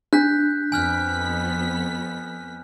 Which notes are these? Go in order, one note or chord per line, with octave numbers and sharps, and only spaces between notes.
D4 F#6 G6 B6
F2 B3 G#5 F6 F#6 B6